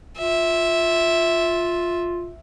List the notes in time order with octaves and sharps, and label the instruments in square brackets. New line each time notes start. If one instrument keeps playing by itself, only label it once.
[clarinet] F4 [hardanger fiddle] E5